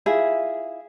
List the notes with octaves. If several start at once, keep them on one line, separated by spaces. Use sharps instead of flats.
E4 F4 G#4 E5